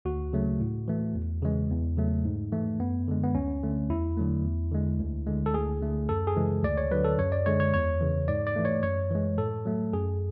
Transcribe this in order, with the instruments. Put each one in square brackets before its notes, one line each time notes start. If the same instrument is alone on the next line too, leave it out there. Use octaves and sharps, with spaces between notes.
[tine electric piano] D2 F#4
C#3 F#3 A3
A2
E3 A3
E2
C#3 E3 G#3
E2
C#3 F#3 A3
G#2
E3 A3
F#2 B3
D3 G#3
B3
D2 C#4
D3 A3
E2 E4
D3 F#3 A3
E2
D3 G#3
D2
D3 G#3
A4
D2 G#4
D3 A3
F#2 A4
G#4
C#3 E3 G#3
D2 D5
C#5
D3 F#3 B4
A4
F#2 C#5
D5
D3 G#3 C#5
C#5
E2 C#5
C#3 E3
G#2 D5
D5
E3 A3
C#5
F#2 C#5
E3 G#3
A2 A4
F#3 A3
F#2 G#4